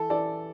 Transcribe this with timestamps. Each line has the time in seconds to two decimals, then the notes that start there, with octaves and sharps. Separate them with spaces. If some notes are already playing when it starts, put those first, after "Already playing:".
Already playing: E3 A4
0.10 E3 A4 D5